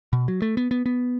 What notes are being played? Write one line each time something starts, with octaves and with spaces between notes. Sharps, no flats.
B2
F#3
A3
B3
B3
B3